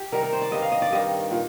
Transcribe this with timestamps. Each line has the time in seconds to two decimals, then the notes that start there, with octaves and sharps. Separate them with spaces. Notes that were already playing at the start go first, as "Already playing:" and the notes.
Already playing: G4
0.12 C3 D#3 G3 A#4
0.23 A#4
0.33 C5
0.42 D5
0.52 G2 D#3 G3 D#5
0.62 F5
0.72 D#5
0.82 D5
0.92 G2 D#3 G3 D#5
1.31 A#2